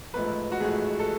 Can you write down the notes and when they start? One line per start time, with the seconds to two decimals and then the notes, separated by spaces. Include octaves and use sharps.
0.14 A1 G#2 F3 A3 B4
0.52 F#4
0.60 A1 G#2 F3 A3 G#4
0.99 A4